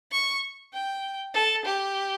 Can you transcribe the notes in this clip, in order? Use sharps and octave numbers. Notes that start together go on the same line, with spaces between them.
C#6
G5
A4
G4